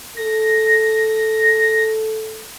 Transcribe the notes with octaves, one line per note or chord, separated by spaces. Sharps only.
A4 A#6